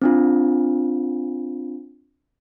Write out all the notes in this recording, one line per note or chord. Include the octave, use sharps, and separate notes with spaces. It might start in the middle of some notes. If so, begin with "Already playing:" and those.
C4 D4 F4